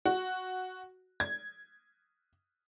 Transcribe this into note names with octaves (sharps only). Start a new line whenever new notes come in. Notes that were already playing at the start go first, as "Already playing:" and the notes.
F#4
G#6